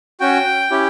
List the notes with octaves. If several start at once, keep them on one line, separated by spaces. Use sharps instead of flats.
C#4 F#4 G5
C#4 E4 G4